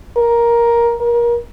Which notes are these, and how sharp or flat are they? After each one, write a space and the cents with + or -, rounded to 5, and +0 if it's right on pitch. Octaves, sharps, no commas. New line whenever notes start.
A#4 +10
A#4 +30